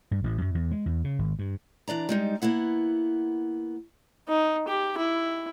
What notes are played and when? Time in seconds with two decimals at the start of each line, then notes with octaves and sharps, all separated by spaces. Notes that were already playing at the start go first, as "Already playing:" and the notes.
0.11 G2
0.24 A1
0.41 F#2
0.55 E2
0.71 G#3
0.86 E2
1.04 C#3
1.19 G#1
1.39 G2
1.88 E3 D4 D5 A#5
2.09 G3 G#3 D#4
2.42 A#3 B3 E4 F#5
4.29 D#4
4.68 G4
4.98 E4